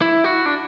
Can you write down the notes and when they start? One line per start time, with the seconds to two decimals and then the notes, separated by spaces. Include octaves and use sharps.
0.02 E4
0.24 F#4
0.46 D4